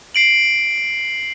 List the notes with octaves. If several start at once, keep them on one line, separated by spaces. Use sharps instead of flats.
C7 D7 F#7